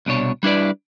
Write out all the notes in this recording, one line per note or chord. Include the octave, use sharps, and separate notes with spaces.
C2 B2 D4 C#5
G3 D4 E4 B4 D5